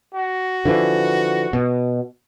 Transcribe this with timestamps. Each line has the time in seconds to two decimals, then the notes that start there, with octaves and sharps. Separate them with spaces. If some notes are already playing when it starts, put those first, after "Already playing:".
0.15 F#4
0.65 D3 E3 F3
1.53 B2